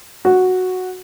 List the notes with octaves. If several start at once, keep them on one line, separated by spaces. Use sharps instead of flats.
F#4